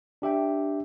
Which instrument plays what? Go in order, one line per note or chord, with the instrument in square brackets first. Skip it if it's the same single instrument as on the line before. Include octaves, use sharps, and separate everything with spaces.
[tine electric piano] D4 G4 E5 G5